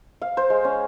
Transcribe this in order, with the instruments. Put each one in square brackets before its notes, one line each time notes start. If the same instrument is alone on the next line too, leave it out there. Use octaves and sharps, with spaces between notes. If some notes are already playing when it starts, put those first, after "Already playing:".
[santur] F5
C5
G#3
C#4